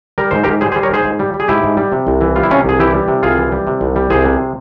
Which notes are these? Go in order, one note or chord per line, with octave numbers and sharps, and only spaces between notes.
G3 A#4
G#2 C5
G4 A#4
G#2
G3 G#4 C5
G#4 C5
G3
A#4 C#5
G#2 G#4 C5
G#2
G3
G3
G#4
G#2 E4 G4
G#2
G3
C3
C2
E3
G3 F4
E4
C3 C#4 F4
C2 G#4
E3 E4 G4
G3
C3
C2 F4 G#4
E3
G3
C3
C2
G3
C2 G#4 C5
C3